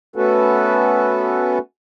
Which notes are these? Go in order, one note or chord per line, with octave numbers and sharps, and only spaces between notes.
A3 B3 C#4 F#4 A4 B4